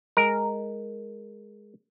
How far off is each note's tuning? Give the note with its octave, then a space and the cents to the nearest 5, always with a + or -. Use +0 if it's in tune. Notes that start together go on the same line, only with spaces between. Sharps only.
G#3 +0 A#4 +0